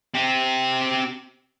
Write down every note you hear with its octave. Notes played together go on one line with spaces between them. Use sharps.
C4 G4